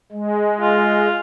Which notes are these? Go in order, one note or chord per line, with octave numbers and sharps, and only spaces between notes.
G#3
F4